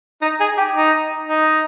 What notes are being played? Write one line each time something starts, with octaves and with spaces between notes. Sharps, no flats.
D#4
G#4
G4
D#4
D#4